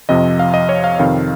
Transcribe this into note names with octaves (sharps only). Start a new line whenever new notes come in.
F2 C3 F3 D#5
F5
D#5
C#5
F5
F2 C3 D#3 F5